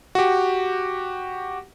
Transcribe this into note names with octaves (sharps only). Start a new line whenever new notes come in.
F#4 G4